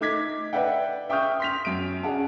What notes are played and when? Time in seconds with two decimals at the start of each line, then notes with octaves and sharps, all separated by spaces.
0.01 A3 D#4 D6 G#6 B6
0.53 B4 D5 E5 F#5 G5
1.09 E5 G5 C#6 D#6 F6 G6
1.40 C6 B6 F7
1.65 F#2 D7
2.03 C#4 D4 G#4 F#5 A5